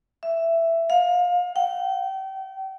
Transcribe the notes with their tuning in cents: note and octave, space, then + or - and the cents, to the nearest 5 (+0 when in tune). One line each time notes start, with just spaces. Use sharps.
E5 +10
F5 +30
G5 -35